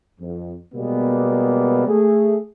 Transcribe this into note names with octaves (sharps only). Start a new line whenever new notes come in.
F2
B2 G3 G#3 A#3 B3
A3 G#4